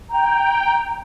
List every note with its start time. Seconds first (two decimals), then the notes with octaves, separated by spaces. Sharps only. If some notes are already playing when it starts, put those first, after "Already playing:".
0.10 G5 A#5